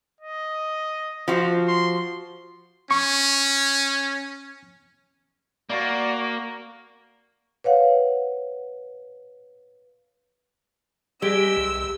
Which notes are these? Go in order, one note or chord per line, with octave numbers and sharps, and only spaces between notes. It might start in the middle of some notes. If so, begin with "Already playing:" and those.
D#5
F3 F#4
C6
C#4 C#6
A#3 F#4 D5
B4 C#5 F5 F#5
G3 G#3 G4 E6
C2